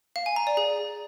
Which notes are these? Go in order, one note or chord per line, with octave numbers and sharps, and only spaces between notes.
F5
G#5
A#5
D5
G#4